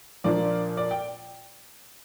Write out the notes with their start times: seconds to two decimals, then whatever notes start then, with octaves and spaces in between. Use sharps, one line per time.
0.24 A#2 F3 A#3 D4 F4 D5
0.77 D5
0.91 G5